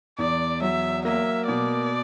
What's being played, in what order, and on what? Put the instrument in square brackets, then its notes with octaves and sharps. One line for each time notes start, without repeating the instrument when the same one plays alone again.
[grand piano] E2 [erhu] D5
[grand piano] F#3 [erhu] E5
[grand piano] A#3 [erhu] E5
[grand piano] B2 [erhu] D5